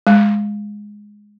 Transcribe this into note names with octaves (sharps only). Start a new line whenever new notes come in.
G#3